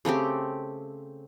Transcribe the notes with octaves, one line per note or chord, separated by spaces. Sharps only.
C#3 A3 C4 G4